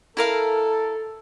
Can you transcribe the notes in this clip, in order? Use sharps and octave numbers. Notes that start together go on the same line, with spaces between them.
E4 A4 A#4 F5